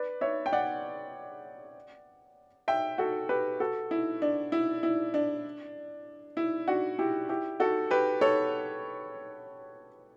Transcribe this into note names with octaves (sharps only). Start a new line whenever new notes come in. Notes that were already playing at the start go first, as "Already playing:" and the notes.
Already playing: B4 D5
C#5 E5
G5
D5 F#5
E5 G5
F#4 A4
G4 B4
F#4 A4
E4
D4
E4
E4
D4
E4
D4 F#4
E4 G4
E4 G4
F#4 A4
G4 B4
A4 C#5